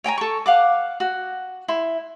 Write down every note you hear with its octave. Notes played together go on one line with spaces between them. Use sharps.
C#5 G5 G#5 A#5
A4 C#6
F5 F#5 D6
F#4
E4 C6